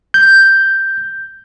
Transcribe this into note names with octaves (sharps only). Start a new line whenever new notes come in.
G6